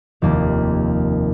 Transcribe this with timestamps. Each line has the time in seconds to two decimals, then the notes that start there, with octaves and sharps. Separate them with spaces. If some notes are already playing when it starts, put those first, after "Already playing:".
0.22 F1 D#2 A#3